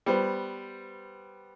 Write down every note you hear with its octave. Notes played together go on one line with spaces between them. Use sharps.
G3 B3 C5